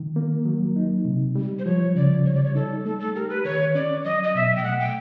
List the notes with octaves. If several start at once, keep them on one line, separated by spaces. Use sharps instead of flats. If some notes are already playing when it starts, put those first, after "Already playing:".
Already playing: D#3
A#3
F#3
D#4
C3
G3
C5
F3 C#5
C#3 D5
G3 C#5
D5
C#5
D#4 A4
A3 A4
A4
G4 A#4
B4
D#3 C#5
C#4 D5
F#3 D#5
D#5
B2 E5
G5
A3 F#5
G5